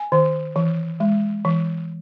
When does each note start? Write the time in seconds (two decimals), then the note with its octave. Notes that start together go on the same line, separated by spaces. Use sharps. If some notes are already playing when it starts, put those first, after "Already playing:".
Already playing: G#5
0.12 D#3
0.56 E3
1.00 G#3
1.45 E3